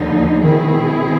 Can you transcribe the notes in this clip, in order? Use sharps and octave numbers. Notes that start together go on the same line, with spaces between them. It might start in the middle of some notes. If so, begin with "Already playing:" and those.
Already playing: D#2 D3 F3 A#3 D#4
B2 D#3 G#3 C4 E4 G#4